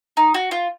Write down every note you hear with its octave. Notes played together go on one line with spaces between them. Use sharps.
D#4
F#4
F4